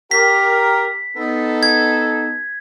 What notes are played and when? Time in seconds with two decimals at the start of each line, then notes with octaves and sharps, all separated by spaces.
0.11 G4 A#4 B6
1.17 B3 D#4 A4
1.63 G#6